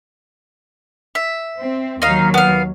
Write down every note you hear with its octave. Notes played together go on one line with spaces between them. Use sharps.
E5
C4
D#2 F#3 D#4 F5
B3 F5